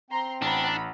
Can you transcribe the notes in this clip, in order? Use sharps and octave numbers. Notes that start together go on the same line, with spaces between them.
C4 G5 A#5 C6
A1 D4 F#5 A#5 B5